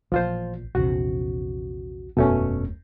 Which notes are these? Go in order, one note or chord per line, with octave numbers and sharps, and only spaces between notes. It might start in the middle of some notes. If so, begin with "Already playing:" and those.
A1 A#2 F3 F4 C5
A#1 E2 C3 F#4
E1 F#2 B2 A3 C#4